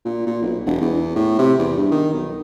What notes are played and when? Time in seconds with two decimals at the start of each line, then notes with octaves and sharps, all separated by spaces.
0.05 A#2
0.27 A#2
0.42 B1
0.66 E1
0.82 E2
1.16 A2
1.39 C3
1.59 E2
1.77 G2
1.92 D#3
2.14 B1